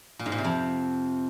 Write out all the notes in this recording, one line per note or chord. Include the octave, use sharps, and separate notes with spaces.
A#2
G#2
A#2
C3
F2